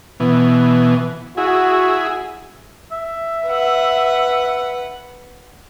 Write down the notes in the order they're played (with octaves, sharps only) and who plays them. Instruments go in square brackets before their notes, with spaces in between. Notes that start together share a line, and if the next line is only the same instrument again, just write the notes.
[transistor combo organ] B2 E3
[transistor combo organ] E4 G#4 [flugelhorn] F#4
[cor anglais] E5
[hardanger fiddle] B4 F#5